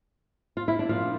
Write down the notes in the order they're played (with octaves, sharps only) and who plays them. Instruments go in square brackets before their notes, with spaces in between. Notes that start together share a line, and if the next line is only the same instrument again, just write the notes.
[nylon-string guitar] F4
E4
D4
A#2 F3 A#3 D4 F4